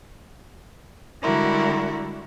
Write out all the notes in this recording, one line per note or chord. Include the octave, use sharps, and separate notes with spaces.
D3 G3 G#3 E4 F#4 A#4